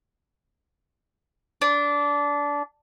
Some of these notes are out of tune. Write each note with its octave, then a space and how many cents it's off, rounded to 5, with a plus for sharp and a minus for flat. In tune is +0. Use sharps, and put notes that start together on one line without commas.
D4 -20